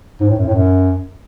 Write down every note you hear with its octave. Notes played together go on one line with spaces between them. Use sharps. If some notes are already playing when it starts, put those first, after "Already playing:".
G#2
A2
F#2
A2
F#2